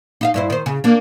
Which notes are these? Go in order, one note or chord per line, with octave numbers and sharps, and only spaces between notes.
D#4 E5 F5
G2 E4 C5
D#3 C5
C#3
A#3 D4